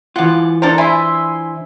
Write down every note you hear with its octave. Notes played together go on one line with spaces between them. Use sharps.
E3 F4 F#5 D6
D4 A4 A#4 C5 A#5
E4 E5 G#5 C6